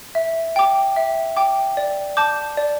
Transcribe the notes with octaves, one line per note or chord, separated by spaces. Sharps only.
E5
G5 D6
E5
G5 D6
D5
A5 D6 G6
D5